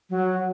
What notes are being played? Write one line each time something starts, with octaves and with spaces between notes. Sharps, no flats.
F#3